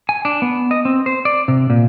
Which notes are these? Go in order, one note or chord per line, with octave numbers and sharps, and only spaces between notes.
G#5
D4
B3
D#5
C4
C5
D5
C3
A#2